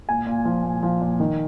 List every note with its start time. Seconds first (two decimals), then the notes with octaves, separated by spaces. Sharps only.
0.09 A#2 G#5
0.27 A#2
0.45 F3
0.64 A#2
0.83 F3
1.02 A#2
1.20 D#3